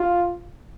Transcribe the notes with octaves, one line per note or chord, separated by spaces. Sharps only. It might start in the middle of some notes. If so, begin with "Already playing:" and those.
Already playing: F4